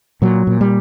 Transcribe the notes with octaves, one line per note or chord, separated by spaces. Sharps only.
A#2 F#3
A#2
G3